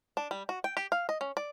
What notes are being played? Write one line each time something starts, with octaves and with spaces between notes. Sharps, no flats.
D4
G3
F#4
G5
G4
F5
D#5
C#4
D5